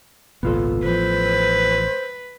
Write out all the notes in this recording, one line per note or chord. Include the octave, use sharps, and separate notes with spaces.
G#1 C#2 A#2 B3 F4 A4
A1 E3 F3 B4 C5